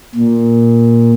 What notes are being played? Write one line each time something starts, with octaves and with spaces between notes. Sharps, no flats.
A#2